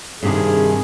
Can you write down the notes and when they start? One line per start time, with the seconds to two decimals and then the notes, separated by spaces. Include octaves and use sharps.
0.23 G2 C3 D#3 G#4